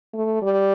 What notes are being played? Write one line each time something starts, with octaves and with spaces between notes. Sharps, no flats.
A3
G3